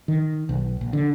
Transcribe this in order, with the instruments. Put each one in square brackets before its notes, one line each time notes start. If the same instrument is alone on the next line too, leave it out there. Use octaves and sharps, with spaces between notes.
[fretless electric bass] D#3
B1
A#1
D3